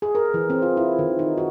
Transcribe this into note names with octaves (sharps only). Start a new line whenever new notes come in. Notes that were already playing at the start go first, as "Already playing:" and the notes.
G#4
A#4
E3
C4
F4
E4
D#3
D#4
F#4